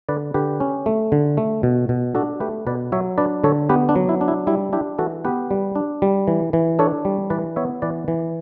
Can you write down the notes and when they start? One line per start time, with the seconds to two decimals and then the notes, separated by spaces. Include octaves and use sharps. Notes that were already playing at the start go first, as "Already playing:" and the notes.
0.09 D3 B4 D5
0.34 D3 G4 B4
0.60 C#4
0.86 A3
1.12 D3
1.37 A3
1.63 B2
1.89 B2
2.15 D4 F#4 A4
2.40 A3 G4 B4
2.67 B2 B4 D5
2.92 F#3 C#5 E5
3.18 D4 B4 D5
3.44 D3 A4 C#5
3.69 B3 G4 B4
3.89 D4
3.96 F#3
4.09 E4
4.21 D4
4.28 E4
4.47 G3 E4
4.73 D4 E4 G4
4.98 E3 F#4 A4
5.25 B3 G4 B4
5.51 G3
5.75 D4
6.02 G3
6.27 E3
6.53 E3
6.79 D4 A4 C#5
7.05 G3
7.30 E3 B4 D5
7.56 B3 C#5 E5
7.82 E3 B4 D5
8.08 E3